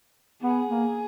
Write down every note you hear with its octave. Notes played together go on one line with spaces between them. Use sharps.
B3 G#4
A#3